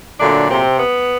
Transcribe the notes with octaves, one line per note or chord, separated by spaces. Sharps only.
A#2 D3 F#3 A3 D4
C3 C4
B3